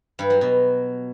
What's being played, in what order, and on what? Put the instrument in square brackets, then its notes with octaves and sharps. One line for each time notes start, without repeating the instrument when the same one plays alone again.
[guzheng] G2
F#3
B2